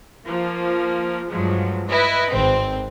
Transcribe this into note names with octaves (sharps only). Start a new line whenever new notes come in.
F3 A#3
G2 F3 F#3 G#3
E4 B4 D#5
G#1 C4